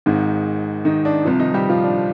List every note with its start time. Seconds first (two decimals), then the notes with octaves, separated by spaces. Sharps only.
0.06 G#1 G#2 D#3
0.85 D#3 D#4
1.05 D4
1.25 C2 C3 F3
1.40 D#3 D#4
1.54 G3 G4
1.70 F3 F4
1.84 D4